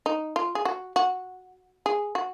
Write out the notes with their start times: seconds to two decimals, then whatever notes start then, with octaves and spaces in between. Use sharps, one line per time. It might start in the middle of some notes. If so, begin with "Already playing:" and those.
0.06 D#4
0.36 F4
0.55 G#4
0.65 F#4
0.96 F#4
1.86 G#4
2.15 F#4